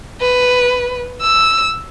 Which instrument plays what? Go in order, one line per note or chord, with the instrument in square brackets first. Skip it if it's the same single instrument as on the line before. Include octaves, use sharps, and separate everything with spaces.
[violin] B4
E6